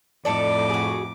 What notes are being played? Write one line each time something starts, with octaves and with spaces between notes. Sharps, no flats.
F2 A2 D#4 A4 D5 D6
F#4 G#4